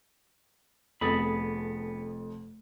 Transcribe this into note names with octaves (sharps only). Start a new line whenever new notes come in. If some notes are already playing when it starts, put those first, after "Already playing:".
F1 F2 B3 G#4 B5 A6